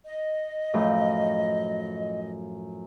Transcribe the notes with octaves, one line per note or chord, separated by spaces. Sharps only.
D#5
F#2 A2 F3